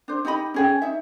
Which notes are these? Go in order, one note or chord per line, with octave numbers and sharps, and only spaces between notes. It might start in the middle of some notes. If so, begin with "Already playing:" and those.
D4 C5
D#4 G4 D#5 B5
C#4 G#4 G5
D#4 E5